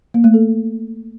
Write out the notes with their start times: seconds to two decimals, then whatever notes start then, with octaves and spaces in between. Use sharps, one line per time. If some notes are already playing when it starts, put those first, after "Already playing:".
0.14 A#3
0.24 A3
0.34 A4